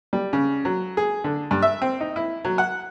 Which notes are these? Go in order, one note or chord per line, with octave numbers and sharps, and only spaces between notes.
G3
C#3
F#3
G#4
D3
G2
E5
C4
D#4
E4
F#3
F#5